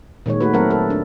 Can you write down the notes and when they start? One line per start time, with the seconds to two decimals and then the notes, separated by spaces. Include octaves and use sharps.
0.26 A#2 D#3 G#3 C#5
0.40 A3 F#4 B4
0.53 F#3 A3 C4 A4 A#4 F#5
0.71 A4
0.90 D4